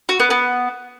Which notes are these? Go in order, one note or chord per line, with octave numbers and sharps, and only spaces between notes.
F#4
B3
B3